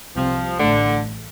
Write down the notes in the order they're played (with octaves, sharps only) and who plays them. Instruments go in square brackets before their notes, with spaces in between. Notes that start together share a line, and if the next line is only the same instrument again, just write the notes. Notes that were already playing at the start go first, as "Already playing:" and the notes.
[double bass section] C2 C3 G3 C4 [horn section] F3
[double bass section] A1 A2 A3 [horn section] D3